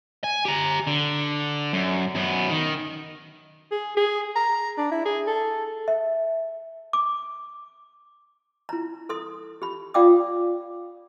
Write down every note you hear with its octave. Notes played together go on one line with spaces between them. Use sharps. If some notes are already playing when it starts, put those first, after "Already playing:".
G#5
G4 A#5
D3
F#2
F#2 B3
D#3
G#4
G#4
A#5
D4
E4
G#4
A4
E5
D6
E4 A#5
A4 C6 D#6
G4 B5
F4 D5 F5 G5 D6 D#6